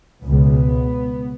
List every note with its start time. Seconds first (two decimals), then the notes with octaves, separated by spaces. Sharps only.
0.23 C#2 B2 B3